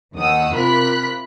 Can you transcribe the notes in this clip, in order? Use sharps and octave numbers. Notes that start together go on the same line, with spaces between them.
D#2 D#3 F#5 D#6 E6
C3 F4 A#4 B5 F#6 B6